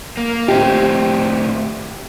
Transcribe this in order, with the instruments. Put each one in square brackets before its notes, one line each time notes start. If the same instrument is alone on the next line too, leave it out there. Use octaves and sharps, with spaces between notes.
[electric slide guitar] A#3
[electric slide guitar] A2 C4 [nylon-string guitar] G4